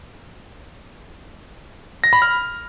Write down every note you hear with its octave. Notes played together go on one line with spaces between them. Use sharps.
A#6
B5
F6